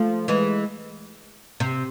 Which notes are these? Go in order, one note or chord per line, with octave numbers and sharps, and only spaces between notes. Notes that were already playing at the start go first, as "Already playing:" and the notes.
Already playing: F3 A3
E3 G#3
C3